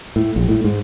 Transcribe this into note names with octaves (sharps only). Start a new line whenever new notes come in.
A2
A#1
A2
G#2